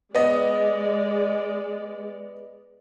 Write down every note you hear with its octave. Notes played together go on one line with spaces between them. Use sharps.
G#3 B3 D5 D#5